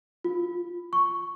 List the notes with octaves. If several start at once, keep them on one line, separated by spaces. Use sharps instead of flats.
F4
C#6